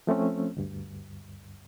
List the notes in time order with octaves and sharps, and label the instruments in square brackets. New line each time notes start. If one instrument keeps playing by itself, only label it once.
[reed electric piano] F3 A3 C4 C#4
D2 G2